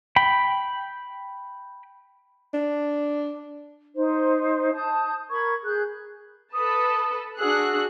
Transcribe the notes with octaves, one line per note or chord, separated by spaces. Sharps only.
G5 B5
D4
D#4 C5
A5 D#6 G6
A#4 B5 C#6 G#6
G#4 F#6 G6
A4 B4 A5 D#6
D4 F#4 G#4 E6 F#6